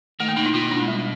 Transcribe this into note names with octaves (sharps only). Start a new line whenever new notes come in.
D#3 A3
A#3
B2 D#4
E4
B2 F4
E4
D4
G#3
G3